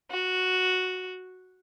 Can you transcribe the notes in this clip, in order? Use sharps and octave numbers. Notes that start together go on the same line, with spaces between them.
F#4